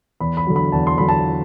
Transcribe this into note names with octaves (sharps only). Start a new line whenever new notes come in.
E2 B5
B5
D3 F#3
B5
E2 A5
C6
D3 F#3 B5
A5